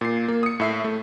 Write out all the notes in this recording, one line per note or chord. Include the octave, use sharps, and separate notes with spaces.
A#2 C7
A#3
D#6 C#7
A2 E5 C7
A3